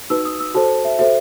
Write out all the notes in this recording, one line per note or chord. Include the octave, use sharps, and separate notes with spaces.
D#4 F#4 B4 E6
D#6
E6
F#4 A4 C5 A5
E5
F#4 A4 C5 E5